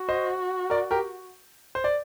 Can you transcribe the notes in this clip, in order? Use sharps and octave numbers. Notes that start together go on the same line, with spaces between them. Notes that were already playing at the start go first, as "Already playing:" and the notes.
Already playing: F#4
C5 D#5
A#4 D5
G4 A#4
C5
D5